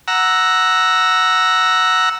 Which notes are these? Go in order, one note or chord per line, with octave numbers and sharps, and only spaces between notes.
F#5 A#5 E6